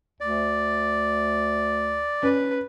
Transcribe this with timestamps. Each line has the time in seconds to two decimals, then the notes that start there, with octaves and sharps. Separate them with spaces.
0.20 D2 D5
2.23 C#4 B4